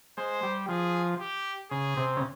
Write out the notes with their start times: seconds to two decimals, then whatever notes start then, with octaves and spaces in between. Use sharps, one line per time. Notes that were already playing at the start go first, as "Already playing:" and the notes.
0.18 G#3 C5
0.43 G3
0.69 F3 G#4
1.20 G4
1.71 C#3 G#4
1.97 C3
2.17 C#3